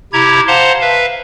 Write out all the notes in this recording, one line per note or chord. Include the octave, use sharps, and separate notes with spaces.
C3 E4 G4 A#5 G#6
C5 F5 F#5 A5 A#5 C6
B4 E5 F5